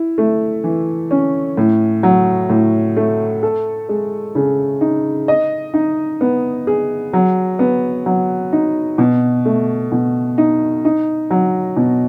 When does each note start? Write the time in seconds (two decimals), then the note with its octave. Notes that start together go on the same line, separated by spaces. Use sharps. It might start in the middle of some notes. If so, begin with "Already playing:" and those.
Already playing: E4
0.18 A3
0.64 E3
1.11 C#4
1.57 A2
2.03 F#3
2.50 A2
2.96 A3
3.43 A4
3.89 G#3
4.35 C#3
4.81 D#4
5.28 D#5
5.74 D#4
6.21 B3
6.67 G#4
7.13 F#3
7.59 B3
8.06 F#3
8.53 D#4
8.98 B2
9.45 A3
9.92 B2
10.38 D#4
10.85 D#4
11.30 F#3
11.77 B2